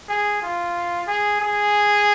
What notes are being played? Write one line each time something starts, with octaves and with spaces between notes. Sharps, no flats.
G#4
F4
G#4
G#4